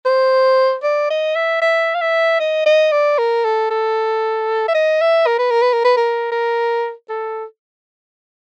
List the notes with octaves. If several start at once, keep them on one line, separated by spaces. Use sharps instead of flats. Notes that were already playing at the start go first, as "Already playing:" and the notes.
C5
D5
D#5
E5
E5
F5
E5
D#5
D#5
D5
A#4
A4
A4
E5
D#5
E5
A#4
B4
A#4
B4
A#4
B4
A#4
A#4
A4